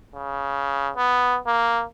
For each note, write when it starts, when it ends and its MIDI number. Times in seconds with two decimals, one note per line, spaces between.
0.15 0.91 49
0.97 1.38 59
1.47 1.83 58